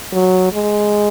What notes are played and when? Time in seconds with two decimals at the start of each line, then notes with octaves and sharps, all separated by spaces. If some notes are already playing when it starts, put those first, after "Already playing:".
0.13 F#3
0.53 G#3